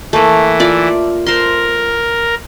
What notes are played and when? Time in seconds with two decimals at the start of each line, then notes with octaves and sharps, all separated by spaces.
0.13 E3 A3 A#3
0.60 F4 D5 E5
1.26 A#4 C5 C6